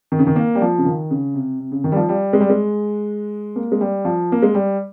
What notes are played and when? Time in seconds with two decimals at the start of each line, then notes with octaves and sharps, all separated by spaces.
0.12 D#3
0.19 C#3
0.27 D#3
0.36 A#3
0.55 G3
0.62 F3
0.78 C#3
0.85 D#3
1.11 C#3
1.34 C3
1.60 C3
1.72 C#3
1.84 D#3
1.92 G3
1.96 F3
2.09 G3
2.33 G#3
2.40 G3
2.50 G#3
3.56 A#3
3.72 G#3
3.81 G3
4.05 F3
4.32 A#3
4.43 G#3
4.54 G3